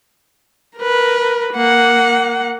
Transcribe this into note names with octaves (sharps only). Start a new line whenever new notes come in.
A#4 B4
A#3 F#5